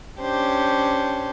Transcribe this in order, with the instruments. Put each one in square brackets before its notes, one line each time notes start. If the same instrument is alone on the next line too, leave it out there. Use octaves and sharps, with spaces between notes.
[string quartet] C#4 D4 G4 C5